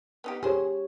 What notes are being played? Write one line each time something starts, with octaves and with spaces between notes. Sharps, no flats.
B3 D#4 G4
G4 G#4 C5 C#5